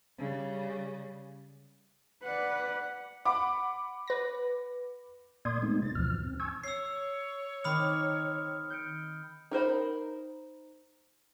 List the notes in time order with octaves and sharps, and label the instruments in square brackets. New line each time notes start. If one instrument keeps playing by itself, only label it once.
[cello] C#3 G3
[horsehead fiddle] B4 D5 [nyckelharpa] F#5
[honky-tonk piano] F#5 B5 D6
[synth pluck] B4 A#6
[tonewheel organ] A#2 A#3 D5 C6 D#6 G#6
G#3 A3 B3 C4 D#4
C3 A6
D2 G2 B2 E3 F3 F6
C4
G#5 C#6 E6 G#6
[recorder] C#5 [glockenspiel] E6 C7
[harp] D#3 C4 D6 [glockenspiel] B5 D#6 F6
[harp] G6 C#7 D7
[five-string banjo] D#4 A#4 C5 B5